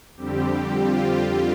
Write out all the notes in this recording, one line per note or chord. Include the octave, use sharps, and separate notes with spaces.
F2 D3 G3 C4 G4
F4